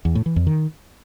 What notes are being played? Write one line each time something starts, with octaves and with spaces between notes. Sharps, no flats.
E2
A2
E3
F2
D#3